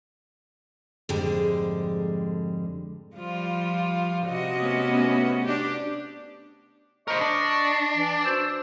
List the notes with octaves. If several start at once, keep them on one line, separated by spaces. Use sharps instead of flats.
F2 G#2 D3 G3 G#3
F3 G3 F4
C3 F#4 D#5
A3 B3 C#4
D4 G4
A#4 C5 D#5 C#6
D4
E3
F#4 C5 E6